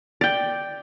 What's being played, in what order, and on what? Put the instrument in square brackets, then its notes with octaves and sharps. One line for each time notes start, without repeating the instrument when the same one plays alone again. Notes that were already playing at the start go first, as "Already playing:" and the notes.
[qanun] D5 G5